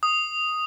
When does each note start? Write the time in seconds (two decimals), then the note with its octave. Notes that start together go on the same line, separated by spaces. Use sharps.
0.03 D#6